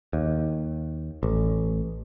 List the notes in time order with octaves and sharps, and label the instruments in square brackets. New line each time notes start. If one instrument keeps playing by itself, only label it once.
[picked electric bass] D#2
A1